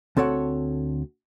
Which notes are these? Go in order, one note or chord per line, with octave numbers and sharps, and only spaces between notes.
D2 C4 A4 C#5 F#5